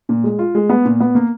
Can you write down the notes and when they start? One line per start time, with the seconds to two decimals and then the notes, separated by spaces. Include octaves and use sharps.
0.09 A#2
0.24 G#3
0.39 F4
0.55 G#3
0.70 B3
0.85 A#2
1.00 B3
1.15 A#3